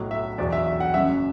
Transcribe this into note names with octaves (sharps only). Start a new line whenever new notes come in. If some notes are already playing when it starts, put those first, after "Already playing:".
Already playing: B1 A2 F#3
E5
E2 B2 F#3 D5
E5
E5
F#5
F#1 F#2 F#3 E5